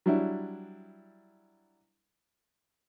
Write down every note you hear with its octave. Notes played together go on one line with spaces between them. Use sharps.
F#3 G3 D4 E4